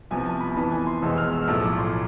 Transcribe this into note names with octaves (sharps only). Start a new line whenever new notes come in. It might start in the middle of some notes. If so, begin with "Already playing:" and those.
C2 C3 F3 B3 G#5
A5
B5
F2 E3 B3 A5
G#5
C6
F1 E2 B2 G#3 B3 E6
F6
E6
F6
B1 A2 F3 A3 E6
D6
C6